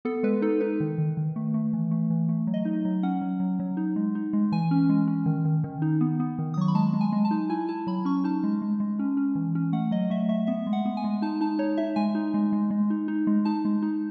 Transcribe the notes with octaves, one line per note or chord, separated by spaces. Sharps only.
B3 A4
G#3 B4
D#4 A4
D#4 B4
D#3
D#3
D#3
A3
A3
E3
A3
E3
A3
F#3
D#5
D#4
F#3
C#4 F#5
F#3
F#3
F#3
D#4
G#3
D#4
G#3
E3 G#5
C#4
G#3
C#4
D#3
D#3
D#3
D#4
B3
B3
D#3
D#6
F#3 C#6
B5
G#3 A5
G#3
G#5
G#3
A5
D#4
E4 G#5
E4 A5
F#3 B5
C#4 C#6
D#4 A5
G#3
G#3
G#3
C#4
C#4
E3
C#4
A3 F#5
F#3 D#5
A3 E5
A3 E5
B3 E5
G#3
F#5
B3
G#5
G#3
D#4 A5
D#4 A5
D#4 C#5
D#4 E5
G#3 G#5
D#4
G#3
G#3
G#3
D#4
D#4
G#3
D#4 A5
G#3
D#4